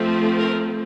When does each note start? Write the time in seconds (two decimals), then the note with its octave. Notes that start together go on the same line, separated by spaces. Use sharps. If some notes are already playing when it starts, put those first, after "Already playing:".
Already playing: F3 A3 C4
0.38 A#4